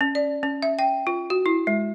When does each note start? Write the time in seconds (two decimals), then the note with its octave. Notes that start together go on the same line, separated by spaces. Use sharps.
0.01 C#4
0.15 D5
0.43 C#4
0.62 E5
0.79 G5
1.07 F4
1.30 F#4
1.46 E4
1.67 G#3